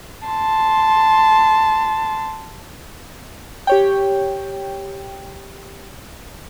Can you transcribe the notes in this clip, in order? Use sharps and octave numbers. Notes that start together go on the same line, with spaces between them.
A5 C6
G4 C#5 G5